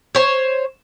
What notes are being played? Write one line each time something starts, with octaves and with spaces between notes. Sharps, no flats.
C5 C#5